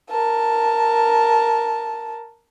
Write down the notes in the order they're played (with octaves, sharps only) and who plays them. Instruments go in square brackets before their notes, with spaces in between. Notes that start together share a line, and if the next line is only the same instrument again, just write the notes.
[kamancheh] A#4 A5